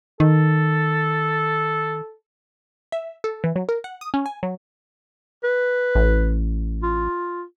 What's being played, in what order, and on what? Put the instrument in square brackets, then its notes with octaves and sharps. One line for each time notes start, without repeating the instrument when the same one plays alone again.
[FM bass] D#3 [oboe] A4
[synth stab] E5
A4
E3
F#3
A#4
F#5
D#6
C#4
G#5
F#3
[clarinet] B4
[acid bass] A1
[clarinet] F4